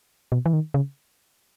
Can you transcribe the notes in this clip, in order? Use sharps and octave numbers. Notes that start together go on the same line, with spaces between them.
B2
E3
D#3
C#3